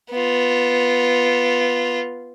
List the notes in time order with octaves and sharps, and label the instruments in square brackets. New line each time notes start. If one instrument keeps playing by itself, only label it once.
[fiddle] B3 F4